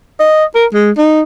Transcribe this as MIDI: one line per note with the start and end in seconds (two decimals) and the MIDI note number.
0.19 0.44 75
0.55 0.66 70
0.73 0.91 56
0.98 1.21 63